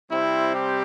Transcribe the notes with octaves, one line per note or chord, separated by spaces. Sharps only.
C3 G3 C4 E4
G4